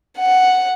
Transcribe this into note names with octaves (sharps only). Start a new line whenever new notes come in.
F#5